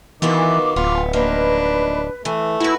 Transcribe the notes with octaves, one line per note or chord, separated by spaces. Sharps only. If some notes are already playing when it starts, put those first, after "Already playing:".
D#3 E3 B3 F4 F#4 D6
D1 B3 F4
F3 A#3 D4 D#4 B4
E3 A3
E4 F#4 B4